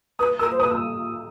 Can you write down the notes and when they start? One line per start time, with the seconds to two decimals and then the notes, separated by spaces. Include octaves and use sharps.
0.19 B4 D#6
0.39 A#4 E6
0.51 C5
0.59 B4 D#6
0.71 E6